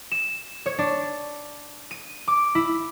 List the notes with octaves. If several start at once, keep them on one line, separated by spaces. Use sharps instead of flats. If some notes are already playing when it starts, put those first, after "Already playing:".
E7
C#5
D4
D#7
D6
E4